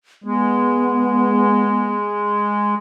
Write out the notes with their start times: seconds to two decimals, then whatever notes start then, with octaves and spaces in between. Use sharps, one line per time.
0.24 G#3 B3